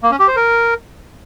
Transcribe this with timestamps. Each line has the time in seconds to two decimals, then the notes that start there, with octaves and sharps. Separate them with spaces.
0.03 A#3
0.11 C#4
0.19 G4
0.28 C5
0.36 A#4